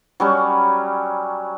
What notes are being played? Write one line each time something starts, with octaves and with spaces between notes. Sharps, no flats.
F#3 G3 C#4